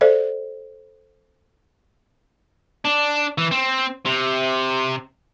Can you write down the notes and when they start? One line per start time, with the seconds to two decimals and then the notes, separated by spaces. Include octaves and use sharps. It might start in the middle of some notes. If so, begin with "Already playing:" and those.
0.01 A4 C5 D5 E5
2.85 D4
3.38 E3
3.51 C4
4.06 C3